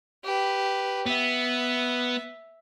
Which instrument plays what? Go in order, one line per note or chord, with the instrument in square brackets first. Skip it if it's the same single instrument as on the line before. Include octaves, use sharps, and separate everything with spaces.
[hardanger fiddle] G4 B4
[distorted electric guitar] B3 [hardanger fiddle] E5